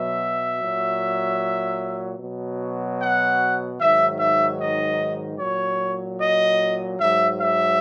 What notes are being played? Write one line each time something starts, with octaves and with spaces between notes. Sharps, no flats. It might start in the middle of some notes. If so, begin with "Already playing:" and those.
Already playing: B2 F#3 E5
A#2 F#3
B2 F#3
F#5
G#2 D#3 F#3 E5
E5
D#5
A#2 F#3 C#5
D#5
G#2 F#3 E5
E5